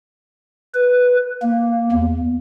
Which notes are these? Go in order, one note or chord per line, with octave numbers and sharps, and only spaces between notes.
B4
A#3
E2